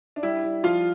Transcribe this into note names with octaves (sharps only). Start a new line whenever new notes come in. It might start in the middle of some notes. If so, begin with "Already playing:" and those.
D4
G3 E4
G3
F3 F4